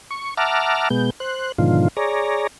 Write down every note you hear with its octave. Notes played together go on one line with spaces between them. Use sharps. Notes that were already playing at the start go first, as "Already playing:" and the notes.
C#6
E5 F#5 A5 A#5 D6 F6
B2 G#3 B3 G6
C5 F#6
G#2 B2 D3 D#3 F3 F4
G#4 C#5 D5 A#5